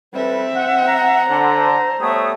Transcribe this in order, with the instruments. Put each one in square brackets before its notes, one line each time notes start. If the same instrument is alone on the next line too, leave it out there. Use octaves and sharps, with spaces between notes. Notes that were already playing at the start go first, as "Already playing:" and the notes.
[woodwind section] G3 A4 B4 [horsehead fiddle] C4 E5
[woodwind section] F#5
[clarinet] A#5
[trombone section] D3 [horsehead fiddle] C5
[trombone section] G3 A3 [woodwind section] B3 C#5 D#6